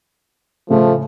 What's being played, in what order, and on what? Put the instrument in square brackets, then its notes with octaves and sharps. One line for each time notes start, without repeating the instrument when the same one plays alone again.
[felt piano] A2 C#3 [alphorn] F3 [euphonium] A3